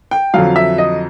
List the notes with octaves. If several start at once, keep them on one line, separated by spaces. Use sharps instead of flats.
G5
F2 D3 F#3 F5
E5
D#5